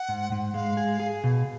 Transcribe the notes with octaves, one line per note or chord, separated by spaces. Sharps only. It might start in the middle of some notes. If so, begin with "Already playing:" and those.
Already playing: F#5
G#2
G#2
G#3 F5
G#4
G#4
B2